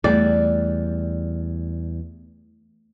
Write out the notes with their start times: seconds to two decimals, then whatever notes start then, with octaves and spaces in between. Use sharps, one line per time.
0.04 E2 G3 A3 D5